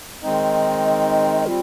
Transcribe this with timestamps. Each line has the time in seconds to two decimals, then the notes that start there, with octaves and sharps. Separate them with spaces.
0.23 D#3 G#3 C4 D#4 D#5
1.46 G3 C4 F4